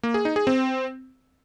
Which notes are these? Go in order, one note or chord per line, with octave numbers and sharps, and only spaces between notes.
A#3
G#4
D#4
G#4
C4